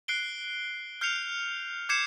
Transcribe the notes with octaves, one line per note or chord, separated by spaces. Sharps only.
F#6 C7 D7 G7
F6 G6 C7 C#7 F7
D6 G6 G#6 C7 C#7 E7